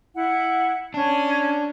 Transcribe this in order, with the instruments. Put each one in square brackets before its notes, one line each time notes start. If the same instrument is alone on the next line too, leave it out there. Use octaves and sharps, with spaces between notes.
[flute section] E4 F#5
[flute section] C#4 [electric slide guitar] D4